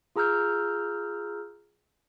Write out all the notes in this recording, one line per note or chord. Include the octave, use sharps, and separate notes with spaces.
F4 G#4 A#5 E6 F6 G6